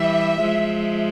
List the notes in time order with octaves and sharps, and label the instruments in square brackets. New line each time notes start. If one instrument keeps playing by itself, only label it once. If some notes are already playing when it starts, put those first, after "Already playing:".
Already playing: [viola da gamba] E3 G3 [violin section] E5
[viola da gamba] F3 G#3